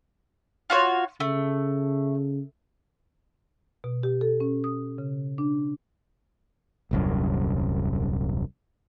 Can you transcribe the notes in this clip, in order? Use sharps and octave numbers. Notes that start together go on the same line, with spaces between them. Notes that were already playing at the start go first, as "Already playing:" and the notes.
F4 F#4 C#5
C#3 A3
B2
G4
A4
C#4
D#6
C#3
D4
D#1 C2 F#2